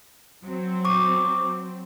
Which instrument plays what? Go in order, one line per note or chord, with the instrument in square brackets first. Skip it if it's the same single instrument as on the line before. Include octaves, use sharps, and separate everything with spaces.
[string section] F#3 C4
[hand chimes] C#6 D6